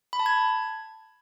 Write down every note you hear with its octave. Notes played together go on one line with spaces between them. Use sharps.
B5
A5
G#6